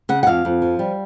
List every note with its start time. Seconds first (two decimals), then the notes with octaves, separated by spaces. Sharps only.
0.09 C#3 F#5
0.23 F#5
0.27 F2 F5
0.45 F2
0.62 F3
0.79 G3